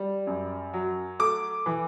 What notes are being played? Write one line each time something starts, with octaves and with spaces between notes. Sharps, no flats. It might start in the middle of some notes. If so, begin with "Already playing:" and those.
Already playing: G3
F#2
F#3
A3 D6
E3